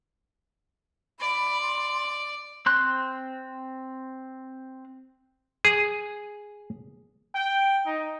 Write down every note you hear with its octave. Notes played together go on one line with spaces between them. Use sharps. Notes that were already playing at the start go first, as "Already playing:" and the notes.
D5 B5
C6
C4 C6 F#6
G#4
G5
D#4